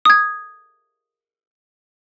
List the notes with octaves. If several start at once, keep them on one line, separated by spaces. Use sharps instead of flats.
D#6 G#6